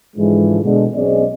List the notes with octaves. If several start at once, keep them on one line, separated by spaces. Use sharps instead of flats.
G#2 D3 E3 F3 G#3
B2 D3 G#3
B1 C4 C#4 G#4 D5 D#5